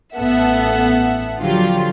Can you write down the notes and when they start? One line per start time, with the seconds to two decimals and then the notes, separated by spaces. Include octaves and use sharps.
0.15 A1 B3 A4 E5 F#5
1.40 D3 F3 F#3 F4 G4